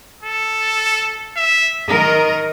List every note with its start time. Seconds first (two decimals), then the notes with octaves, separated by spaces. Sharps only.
0.23 A4
1.37 E5
1.88 D#3 A#4 D#5